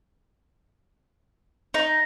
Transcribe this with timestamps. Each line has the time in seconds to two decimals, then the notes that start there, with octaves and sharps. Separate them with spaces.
1.74 D#4